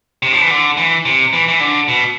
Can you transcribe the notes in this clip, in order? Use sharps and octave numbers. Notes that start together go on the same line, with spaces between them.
C3
F3
E3
D3
E3
C3
E3
E3
D3
B2